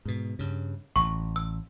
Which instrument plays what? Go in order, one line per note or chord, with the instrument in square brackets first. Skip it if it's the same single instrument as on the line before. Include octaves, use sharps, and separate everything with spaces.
[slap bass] G#2 B2
G2 C#3
[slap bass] A1 [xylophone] C#6
[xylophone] E6